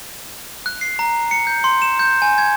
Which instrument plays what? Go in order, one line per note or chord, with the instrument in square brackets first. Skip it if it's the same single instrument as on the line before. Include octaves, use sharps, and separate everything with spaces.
[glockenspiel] F#6
C7
A#5
C#7
G6
C6
E7
G6
G#5
G#6